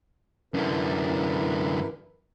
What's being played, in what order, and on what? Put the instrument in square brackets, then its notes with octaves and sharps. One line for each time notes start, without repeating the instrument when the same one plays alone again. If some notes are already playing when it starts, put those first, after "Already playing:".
[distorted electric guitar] F#2 D3 [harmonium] E4 A#4 B4